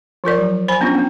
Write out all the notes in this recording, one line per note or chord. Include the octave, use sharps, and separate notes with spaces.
F3 F4 A#4 D5
F#3
C5 G#5 B5
B3 C#4 D4 F4
B3